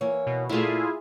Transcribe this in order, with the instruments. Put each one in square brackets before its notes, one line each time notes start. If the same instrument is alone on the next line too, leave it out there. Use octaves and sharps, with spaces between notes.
[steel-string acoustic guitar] E3 A#3 C#5
[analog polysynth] B2
[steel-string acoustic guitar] A#2 A3 [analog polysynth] E4 F4 G#4